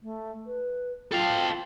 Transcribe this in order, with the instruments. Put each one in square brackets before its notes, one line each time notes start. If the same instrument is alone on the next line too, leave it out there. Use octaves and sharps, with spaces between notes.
[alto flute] A3
B4
[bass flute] F4 [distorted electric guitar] A4 F5 [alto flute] G5